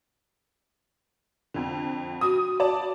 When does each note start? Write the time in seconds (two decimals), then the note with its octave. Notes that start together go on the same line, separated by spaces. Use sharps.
1.54 F2 D3
2.21 F#4 D#6
2.60 D5 A5